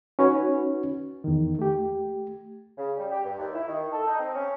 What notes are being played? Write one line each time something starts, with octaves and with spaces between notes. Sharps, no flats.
C#4 D#4 F#4 B4 C#5
E2 D#3
A3 G4
C#3
G3
G4
G2
D#2
E4
D#3
A4
D#4
C4
C#4